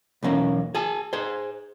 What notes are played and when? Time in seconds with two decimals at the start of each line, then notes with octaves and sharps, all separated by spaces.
0.23 B1 E2 A#3 C#4
0.75 G#4 G#5 A5
1.13 G#4 C5